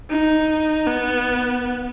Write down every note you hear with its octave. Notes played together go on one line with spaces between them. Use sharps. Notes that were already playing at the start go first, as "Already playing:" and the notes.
D#4
B3